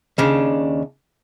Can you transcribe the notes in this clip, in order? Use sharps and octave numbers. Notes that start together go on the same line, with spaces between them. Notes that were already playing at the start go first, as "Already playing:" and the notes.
D#2 C#3 D4